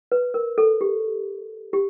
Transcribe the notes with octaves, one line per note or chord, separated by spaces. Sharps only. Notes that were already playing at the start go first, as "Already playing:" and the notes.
B4
A#4
A4
G4
G4